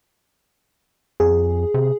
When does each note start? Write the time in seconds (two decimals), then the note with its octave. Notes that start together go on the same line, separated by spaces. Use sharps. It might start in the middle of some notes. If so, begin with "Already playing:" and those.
1.20 F2 G#4
1.74 C3